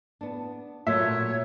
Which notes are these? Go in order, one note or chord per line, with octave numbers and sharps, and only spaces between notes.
B3 D4
A#2 F#3 A3 C#5 E5